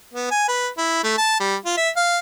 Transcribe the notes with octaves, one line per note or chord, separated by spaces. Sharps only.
B3
G#5
B4
E4
A3
A5
G3
F4
E5
F5